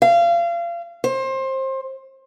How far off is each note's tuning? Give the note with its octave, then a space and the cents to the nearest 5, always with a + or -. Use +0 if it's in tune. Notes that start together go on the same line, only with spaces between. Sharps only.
F5 -30
C5 +25